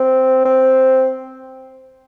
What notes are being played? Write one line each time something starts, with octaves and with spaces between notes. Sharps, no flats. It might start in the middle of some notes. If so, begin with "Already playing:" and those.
Already playing: C4
C4